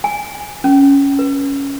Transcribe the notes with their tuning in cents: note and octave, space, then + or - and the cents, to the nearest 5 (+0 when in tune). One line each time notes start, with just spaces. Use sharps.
G#5 -10
C#4 +5
B4 -25